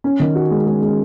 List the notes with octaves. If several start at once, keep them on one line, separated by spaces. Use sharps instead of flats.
C#4
D#3
F#4
G#3
G#3
G#3